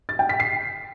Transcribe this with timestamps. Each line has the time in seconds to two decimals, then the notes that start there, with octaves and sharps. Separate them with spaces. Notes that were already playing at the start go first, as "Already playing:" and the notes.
0.09 A6
0.19 G5
0.29 B6
0.40 C7